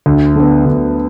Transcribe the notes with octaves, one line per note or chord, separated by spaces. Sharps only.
D2
D3 B3
D2